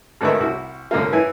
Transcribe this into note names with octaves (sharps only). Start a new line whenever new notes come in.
G#1 D3 D#3 B4 C#5 E5
C2 E4 F#4 E6
C2 D3 A#3 F4
E3 E4 G#5 E6